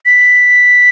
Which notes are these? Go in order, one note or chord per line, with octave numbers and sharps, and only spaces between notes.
B6